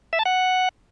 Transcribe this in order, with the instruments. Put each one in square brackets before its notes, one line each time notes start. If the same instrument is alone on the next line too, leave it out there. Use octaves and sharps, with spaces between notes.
[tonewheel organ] E5
A5
F#5